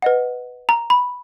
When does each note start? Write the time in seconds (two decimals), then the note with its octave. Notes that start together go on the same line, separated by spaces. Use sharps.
0.02 B4 D#5 F#5
0.69 A#5
0.90 B5